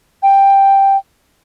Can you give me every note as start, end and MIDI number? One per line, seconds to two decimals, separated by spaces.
0.23 0.97 79